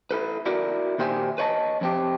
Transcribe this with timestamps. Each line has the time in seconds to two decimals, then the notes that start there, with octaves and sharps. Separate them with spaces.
0.11 E4 A4 B4
0.46 E4 F#4 A#4 D5 E5
0.98 D#2 A#2 G4 C5 E5 G#5
1.38 B4 C#5 D#5 A5
1.81 F2 C4 G4